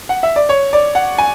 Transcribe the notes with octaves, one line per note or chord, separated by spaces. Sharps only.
F#5
E5
D5
C#5
D5
F#5
G#5